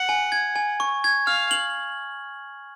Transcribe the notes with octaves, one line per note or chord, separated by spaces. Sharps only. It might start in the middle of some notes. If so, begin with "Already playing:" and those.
Already playing: F#5
G#5
G#6
G#5
C#6
G#6
F5 F6
F#7